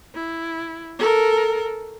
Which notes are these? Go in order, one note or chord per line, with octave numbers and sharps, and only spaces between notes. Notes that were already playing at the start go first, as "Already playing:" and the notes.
E4
A4 A#4